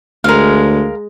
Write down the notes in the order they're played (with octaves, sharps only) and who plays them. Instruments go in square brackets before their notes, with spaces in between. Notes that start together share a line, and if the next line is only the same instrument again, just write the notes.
[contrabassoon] D2 [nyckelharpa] G#3 [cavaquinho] A#4 F5